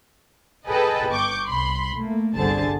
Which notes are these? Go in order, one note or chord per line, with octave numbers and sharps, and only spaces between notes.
G#4 A4 B4 D#5 G5 A5
G1 C#6 D6 G6
C2 B5 C6
A3 A#3
G1 C2 D3 G#4 C5 A5